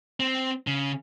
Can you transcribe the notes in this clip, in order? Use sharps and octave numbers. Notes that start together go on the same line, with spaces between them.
C4
C#3